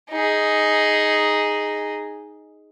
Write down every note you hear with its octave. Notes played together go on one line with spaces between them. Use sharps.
D#4 G#4